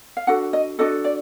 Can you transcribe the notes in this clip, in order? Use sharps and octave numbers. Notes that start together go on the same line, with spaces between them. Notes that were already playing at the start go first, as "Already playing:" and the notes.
F5
D4 F#4 A4 F#5
D#5
D4 F#4 A4 D#5
D5